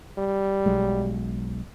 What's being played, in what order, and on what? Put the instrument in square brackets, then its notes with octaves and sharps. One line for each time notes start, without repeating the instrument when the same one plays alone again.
[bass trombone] G3
[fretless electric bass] B1 F#3 G#3